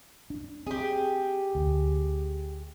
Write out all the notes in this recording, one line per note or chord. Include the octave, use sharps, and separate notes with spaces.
D4
C4 G4 G#4
D2